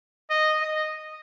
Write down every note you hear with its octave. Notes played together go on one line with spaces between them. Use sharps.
D#5
D#5